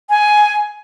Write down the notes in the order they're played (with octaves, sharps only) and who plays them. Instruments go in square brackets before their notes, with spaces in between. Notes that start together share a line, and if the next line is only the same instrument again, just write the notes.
[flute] G#5